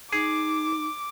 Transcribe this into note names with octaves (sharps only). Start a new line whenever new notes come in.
D#4 G#4 D6